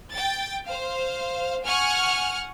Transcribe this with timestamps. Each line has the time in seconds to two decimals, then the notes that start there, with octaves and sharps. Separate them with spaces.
0.12 G5 A6
0.66 C5 F5
1.64 F#5 G#5 C#6 F6